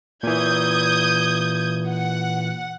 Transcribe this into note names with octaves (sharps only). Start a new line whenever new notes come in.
A#2 E3 D#6 G6 G#6
F#5